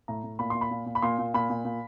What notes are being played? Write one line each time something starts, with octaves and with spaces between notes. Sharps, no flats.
A2 A#5
A2
A#2 B5
A#2 C6
B5
A#2
A#2
B5
A#2 C6
A#2
A#2 B5
A#2
A#2